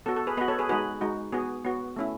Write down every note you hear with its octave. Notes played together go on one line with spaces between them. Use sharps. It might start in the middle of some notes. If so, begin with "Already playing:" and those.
B3 F#4 A4
A4
G#4 B4
B3 F#4 B4 D#5
A4 C#5
G#4 B4
G#3 D#4 F#4 G#4 B4
G#3 D#4 F#4
B3 F#4 G#4
B3 F#4
A3 C#4 E4